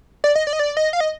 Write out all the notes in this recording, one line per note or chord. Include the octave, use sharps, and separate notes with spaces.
D5
D#5
D5
D#5
D5
D#5
F5
D#5